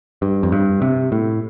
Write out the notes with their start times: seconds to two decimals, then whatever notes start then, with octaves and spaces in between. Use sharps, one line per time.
0.22 G2
0.43 F2
0.52 G2
0.82 C3
1.12 A2